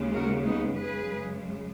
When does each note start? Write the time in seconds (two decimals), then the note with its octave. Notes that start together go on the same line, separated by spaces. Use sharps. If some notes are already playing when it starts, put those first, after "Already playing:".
Already playing: D#2 C#3 G#3
0.14 F#4 A#4
0.45 B3 D#4
0.77 F#2 C#3 G#3 G#4 B4